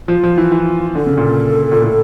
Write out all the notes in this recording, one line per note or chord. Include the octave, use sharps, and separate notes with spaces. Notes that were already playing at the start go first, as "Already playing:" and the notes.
F3 F4
F3
E3
E3
D3 A4
C#3
A#2
A#2
A2